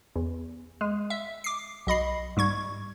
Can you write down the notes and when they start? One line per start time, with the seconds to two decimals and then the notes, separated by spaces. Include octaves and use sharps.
0.16 E2
0.81 G#3
1.10 E5
1.44 D6 C7
1.87 B1 D#5 B5 C7
2.37 G#2 G3 C#6 G#6